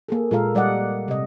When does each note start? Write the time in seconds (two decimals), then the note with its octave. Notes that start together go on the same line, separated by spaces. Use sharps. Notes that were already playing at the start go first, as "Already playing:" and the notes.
0.08 A#3 G#4 A4
0.31 A#2 G#3 F4 A4 A#4 F5
0.55 G3 D5 D#5 F#5
1.08 C3 D#5